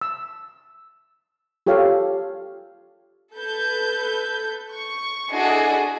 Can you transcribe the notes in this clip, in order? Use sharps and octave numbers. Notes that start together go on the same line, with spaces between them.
E6
F4 G4 A4 C#5 F5
A4 B4 G6
C#6
D4 E4 F#4 G#4 A4 D#5